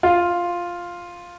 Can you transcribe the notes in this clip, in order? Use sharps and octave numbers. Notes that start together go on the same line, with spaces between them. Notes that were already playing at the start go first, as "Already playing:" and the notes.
F4